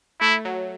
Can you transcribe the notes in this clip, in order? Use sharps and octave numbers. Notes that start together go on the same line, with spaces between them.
A3 E4
F#3